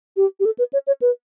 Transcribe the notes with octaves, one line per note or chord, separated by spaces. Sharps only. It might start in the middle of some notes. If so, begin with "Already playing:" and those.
G4
G4
A4
B4
C#5
C#5
B4